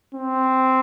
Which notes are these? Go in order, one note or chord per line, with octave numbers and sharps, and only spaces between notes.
C4